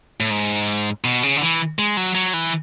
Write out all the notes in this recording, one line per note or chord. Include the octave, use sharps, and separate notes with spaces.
A2
G#2
B2
C#3
D3
E3
G#3
F#3
F#3
E3